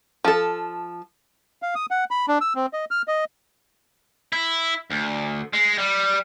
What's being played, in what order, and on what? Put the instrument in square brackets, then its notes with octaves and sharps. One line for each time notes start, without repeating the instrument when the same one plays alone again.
[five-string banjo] F3 A4
[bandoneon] F5
D#6
F#5
B5
D4
E6
C4
D#5
F6
D#5
[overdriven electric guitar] E4
D2
G#3
G3